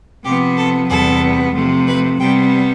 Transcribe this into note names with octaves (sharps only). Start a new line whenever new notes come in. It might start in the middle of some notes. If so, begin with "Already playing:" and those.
C3 F3 B3 G4
A4
E2 C3 G3 B3 A4
C3 F3 A3
B4
C3 G3 B3 G5